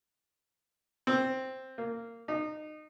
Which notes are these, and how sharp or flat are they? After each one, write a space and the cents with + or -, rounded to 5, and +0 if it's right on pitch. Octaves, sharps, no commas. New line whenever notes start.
C4 +5
A#3 -15
D#4 -25